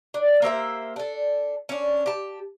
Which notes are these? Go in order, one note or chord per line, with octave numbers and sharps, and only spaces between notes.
D4
A#3 G4 C5 E5
D4 A4
C#4 D4
G4 A5